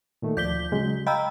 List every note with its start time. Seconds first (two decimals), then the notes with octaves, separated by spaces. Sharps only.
0.22 A#2 D#3 A3
0.37 D2 F3 D5 G6 B6 G7
0.72 C#3 F#3 G#3
1.07 D#5 F5 G5 A#5 B5 E6